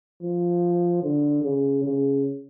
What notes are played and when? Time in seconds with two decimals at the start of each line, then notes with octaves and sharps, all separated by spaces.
0.23 F3
1.03 D3
1.43 C#3
1.83 C#3